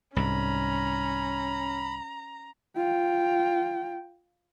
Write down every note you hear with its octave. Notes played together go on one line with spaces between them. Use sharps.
C2 G#2 C#4 A#5 B5
F4 G5